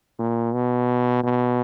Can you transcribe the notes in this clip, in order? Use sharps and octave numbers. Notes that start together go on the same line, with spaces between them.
A#2
B2
B2